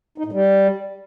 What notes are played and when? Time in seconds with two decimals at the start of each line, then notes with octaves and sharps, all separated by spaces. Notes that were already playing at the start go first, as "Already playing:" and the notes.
0.18 D#4
0.25 A2
0.32 G3